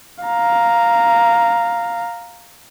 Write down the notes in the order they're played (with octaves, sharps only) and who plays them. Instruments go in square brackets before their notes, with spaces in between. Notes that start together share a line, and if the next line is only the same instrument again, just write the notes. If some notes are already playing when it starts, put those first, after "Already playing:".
[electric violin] F5 A#5